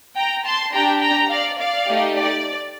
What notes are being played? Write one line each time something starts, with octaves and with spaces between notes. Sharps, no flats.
G5 A#5
A5 C6
D4 G4 G5 A#5
G5 A#5
D5 F5
D5 F5
A3 D#4 G4
D5